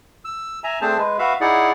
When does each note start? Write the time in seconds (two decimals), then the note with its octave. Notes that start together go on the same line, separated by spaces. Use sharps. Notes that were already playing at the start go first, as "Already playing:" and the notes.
0.25 E6
0.64 E5 G#5 A#5
0.81 A3 C4 D4 G#4 C5 A5
0.98 G#3 B4
1.19 F#4 B4 E5 F5
1.41 D#4 E4 G#4 D5 F#5